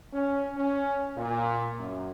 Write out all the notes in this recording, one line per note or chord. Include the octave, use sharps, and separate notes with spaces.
C#4
C#4
A#2
F#2